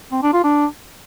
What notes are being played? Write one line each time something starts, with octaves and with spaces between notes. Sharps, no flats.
C4
D4
F4
D4